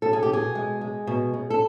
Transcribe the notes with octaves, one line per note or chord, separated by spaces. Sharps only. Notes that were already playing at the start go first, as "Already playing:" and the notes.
B2 A4
G#4
G4
B2 G#4
G#3
G#3
B2
B2
A4